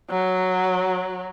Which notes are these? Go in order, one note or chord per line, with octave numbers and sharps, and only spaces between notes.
F#3